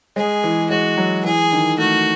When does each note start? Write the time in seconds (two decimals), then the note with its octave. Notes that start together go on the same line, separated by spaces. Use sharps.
0.16 G#3 G#4
0.44 E3
0.70 G#3 F#4
0.97 F#3
1.25 E3 G#4
1.52 D#3
1.78 A3 F#4